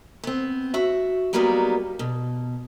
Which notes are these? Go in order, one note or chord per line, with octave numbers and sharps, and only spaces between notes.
B3 C4
F#4 E5
D#2 F#3 G3 A#3 B3 D#4
B2